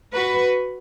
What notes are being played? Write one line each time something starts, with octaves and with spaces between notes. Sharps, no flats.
F#4 B4